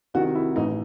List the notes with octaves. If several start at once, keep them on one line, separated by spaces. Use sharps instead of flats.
C2 C3 D#3 F#4
E4
A1 A2 E3 D#4